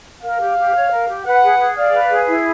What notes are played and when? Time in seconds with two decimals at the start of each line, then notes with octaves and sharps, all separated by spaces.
0.23 A#4 F5
0.40 G4
0.57 G4
0.74 C#5
0.91 A#4
1.09 G4
1.25 B4 F#5
1.43 G#4
1.59 G#4
1.77 D5 F5
1.94 B4
2.11 G#4
2.28 E4